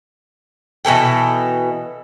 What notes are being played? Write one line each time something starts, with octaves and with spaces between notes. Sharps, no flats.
B2 E3 A4 G5